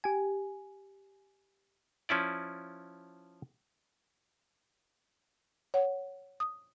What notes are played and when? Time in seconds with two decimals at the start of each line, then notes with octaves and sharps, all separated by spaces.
0.04 G4 G#5
2.09 F3 C#4 E4 D5
5.74 C#5 F#5
6.40 D#6